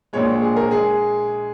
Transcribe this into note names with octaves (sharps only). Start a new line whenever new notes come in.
A#1 A#2 G#3 C#5
G#4
A#4
G#3 G#4